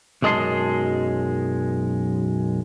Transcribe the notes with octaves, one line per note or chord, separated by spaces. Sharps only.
B1 F#2 G#3 D#5 A5 C6